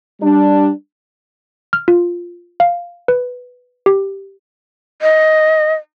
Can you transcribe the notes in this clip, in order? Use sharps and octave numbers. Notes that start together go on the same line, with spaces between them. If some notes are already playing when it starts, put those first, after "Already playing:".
G3 D4
F6
F4
F5
B4
G4
D#5